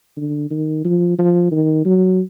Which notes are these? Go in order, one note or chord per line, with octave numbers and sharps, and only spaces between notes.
D3
D#3
F3
F3
D#3
F#3